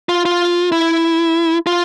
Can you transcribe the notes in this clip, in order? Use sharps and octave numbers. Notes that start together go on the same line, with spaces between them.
F4
F4
E4
F4